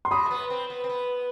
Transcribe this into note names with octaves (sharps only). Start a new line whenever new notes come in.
C6
F#3 B5 D#6
A3
B3
C4
B3
C4
B3